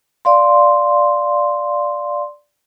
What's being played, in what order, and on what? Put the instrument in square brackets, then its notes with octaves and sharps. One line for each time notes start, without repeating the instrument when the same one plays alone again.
[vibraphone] D5 F5 C6